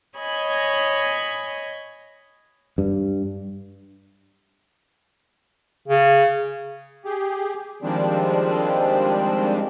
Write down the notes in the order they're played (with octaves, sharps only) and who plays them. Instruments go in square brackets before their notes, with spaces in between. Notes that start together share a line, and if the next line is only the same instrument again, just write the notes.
[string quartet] C#5 D#5 G#5 B5
[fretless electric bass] G2
[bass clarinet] C#3
[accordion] G4 G#4
D#3 F3 G3 G#3 C4 D4